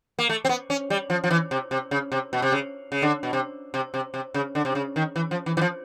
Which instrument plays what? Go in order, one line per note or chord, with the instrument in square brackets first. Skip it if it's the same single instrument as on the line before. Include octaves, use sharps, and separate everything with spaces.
[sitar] A#3
A3
C4
B3
C#4
G3
F3
F3
E3
C3
C3
C#3
C3
B2
C3
C#3
C#3
D3
B2
C3
C3
C3
C3
C#3
D3
C3
C#3
D#3
E3
F3
E3
E3
F3